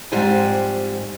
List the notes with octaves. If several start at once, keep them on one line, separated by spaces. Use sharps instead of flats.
F2 G#2 G3 G4 C5 G#5